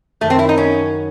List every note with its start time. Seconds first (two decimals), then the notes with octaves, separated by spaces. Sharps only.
0.21 F#2 D#3 F#3 A3
0.30 C4
0.39 E4
0.49 D#4
0.57 C#4